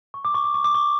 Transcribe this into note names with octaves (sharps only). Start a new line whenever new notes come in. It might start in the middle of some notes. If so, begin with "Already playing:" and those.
C#6
D6
C#6
D6
C#6
D6
C#6